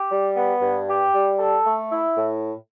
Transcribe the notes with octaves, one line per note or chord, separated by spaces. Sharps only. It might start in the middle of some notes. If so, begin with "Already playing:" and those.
Already playing: G4
G3
B3
G2
G4
G3
A4
A3
E4
A2